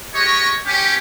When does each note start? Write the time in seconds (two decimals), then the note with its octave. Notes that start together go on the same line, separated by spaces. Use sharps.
0.15 G#3 G4 C#5 D#5 C#6
0.66 C#4 G4